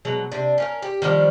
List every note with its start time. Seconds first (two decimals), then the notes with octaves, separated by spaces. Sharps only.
0.05 B2 F#3 G#3
0.32 C3 D4
0.58 C#4 F4 A#4
0.82 G4
1.02 D#3 F3 G3 D4